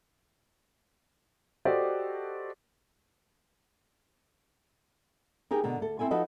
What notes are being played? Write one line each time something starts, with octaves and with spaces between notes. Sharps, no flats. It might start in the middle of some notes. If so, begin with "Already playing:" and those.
F#4 G4 A4 C5 D5 D#5
D#4 G4 G#4 A#4
B2 D3 A#4
D2 A4
C4 E4 A4 G#5
F3 D#4 F#4 A4 B4 D#5